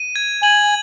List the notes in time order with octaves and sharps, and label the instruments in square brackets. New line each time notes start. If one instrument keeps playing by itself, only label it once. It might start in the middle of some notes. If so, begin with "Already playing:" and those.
Already playing: [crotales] D#7
G#6
[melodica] G#5 [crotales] F#7